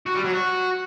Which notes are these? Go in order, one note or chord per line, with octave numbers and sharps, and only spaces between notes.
F#4
G3
F#3
F#4